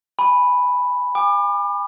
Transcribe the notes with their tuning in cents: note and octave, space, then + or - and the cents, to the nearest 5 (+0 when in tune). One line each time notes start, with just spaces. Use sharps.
G#5 +0 B5 +0
G#5 -40 D6 +35